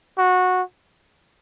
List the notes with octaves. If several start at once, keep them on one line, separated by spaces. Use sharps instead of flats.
F#4